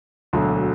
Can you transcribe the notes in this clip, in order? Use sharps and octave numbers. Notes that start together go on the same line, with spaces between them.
E1 D2 D3 F#3